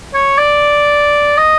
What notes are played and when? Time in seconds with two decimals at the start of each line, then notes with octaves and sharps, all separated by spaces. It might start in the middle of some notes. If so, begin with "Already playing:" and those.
0.14 C#5
0.38 D5
1.37 D#5